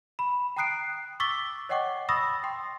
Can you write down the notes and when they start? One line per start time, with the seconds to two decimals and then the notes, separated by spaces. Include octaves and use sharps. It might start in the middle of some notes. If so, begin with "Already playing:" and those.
0.19 B5
0.57 G5 A#5 D#6 F#6 C7 D7
1.20 C#6 D6 E6 A6 B6 G7
1.69 C#5 D#5 F#5 G5 C#6 D6
2.09 B5 C#6 D#6 E6 A6 A#6
2.44 G5 C6